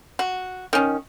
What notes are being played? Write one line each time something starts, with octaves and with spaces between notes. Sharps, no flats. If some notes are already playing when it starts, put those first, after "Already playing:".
F#4
D#3 C#4